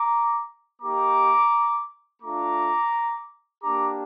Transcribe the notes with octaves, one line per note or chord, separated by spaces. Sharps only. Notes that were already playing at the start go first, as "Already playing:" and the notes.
Already playing: A#5 D6
A#3 D#4 G4 A#5 D6
A3 D4 F4 A#5 D6
A#3 D4 G4 A#5 D6